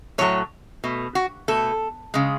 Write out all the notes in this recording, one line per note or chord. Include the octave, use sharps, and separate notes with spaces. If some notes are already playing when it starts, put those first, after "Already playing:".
A2 F#3 A3 C#5
B2 A3
F#4
B2 A3 A4
C#3 G#3